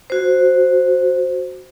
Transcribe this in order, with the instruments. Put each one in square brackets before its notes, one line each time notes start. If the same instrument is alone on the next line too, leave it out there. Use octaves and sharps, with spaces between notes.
[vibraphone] F#4 C5